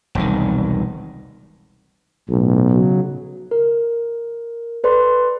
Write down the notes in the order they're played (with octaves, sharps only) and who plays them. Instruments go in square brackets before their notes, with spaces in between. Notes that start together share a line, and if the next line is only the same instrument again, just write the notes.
[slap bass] E1 C2 D#3
[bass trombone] B1 [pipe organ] A2
[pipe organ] C#3 F#3
[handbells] A#4
A4 B4 D5 C6